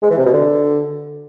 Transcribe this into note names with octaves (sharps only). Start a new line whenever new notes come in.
G#3
E3
C3
B2
D3